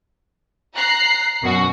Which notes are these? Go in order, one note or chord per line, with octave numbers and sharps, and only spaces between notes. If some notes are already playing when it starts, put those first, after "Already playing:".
A#5 F#6 C7
F#2 B2 F#4